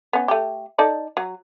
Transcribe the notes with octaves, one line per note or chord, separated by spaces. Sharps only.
B3 C#4
A3 G4
D#4 A4 D5
F#3